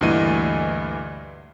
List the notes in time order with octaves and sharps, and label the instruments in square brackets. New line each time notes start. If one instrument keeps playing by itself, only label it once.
[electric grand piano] D2 G2 A#2 E3 D#5 D#7